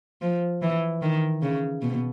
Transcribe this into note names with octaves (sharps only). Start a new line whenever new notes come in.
F3
E3
D#3
C#3
B2